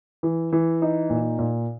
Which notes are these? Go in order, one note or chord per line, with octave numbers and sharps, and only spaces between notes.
E3
E3
D#4
A#2
A#2